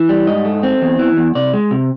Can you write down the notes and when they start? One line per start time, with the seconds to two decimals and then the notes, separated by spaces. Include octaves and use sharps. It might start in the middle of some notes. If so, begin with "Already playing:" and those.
Already playing: E3
0.09 G3
0.27 G#2 D#5
0.45 A3
0.63 C4
0.82 E2
0.99 E3
1.17 E2
1.35 C3 D5
1.53 G#3
1.71 C3